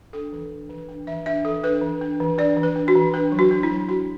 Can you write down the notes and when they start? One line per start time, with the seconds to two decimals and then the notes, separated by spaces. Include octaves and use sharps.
0.13 D4 A4
0.33 E3
0.51 D4
0.70 E3
0.89 D4
1.07 E3 E5
1.26 D4 E5
1.45 E3 A4
1.63 D4 B4
1.82 E3
2.01 D4
2.20 E3
2.38 D4 D5
2.57 E3
2.63 B4
2.76 D4
2.88 F#4
2.95 E3
3.14 D4 B4
3.32 F#3
3.39 F#4
3.51 D4
3.63 E4
3.70 F#3
3.89 D4 F#4